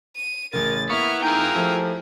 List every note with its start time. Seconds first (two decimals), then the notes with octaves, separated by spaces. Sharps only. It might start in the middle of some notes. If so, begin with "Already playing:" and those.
0.16 D#7
0.53 A1 C#3 A#4 A6
0.90 A#3 B3 E4 E5 C#6 F6
1.22 D#4 F4 G#4 A#4 G5
1.54 F3 A3 E4 G4